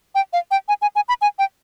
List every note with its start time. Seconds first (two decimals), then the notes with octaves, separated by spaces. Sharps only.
0.15 G5
0.33 F5
0.51 G5
0.68 G#5
0.82 G#5
0.96 G#5
1.08 B5
1.22 G#5
1.39 G5